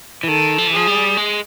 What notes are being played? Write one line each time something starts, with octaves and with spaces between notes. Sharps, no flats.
E3
D#3 A4
F3
E3
F3 G#4
G3
G#3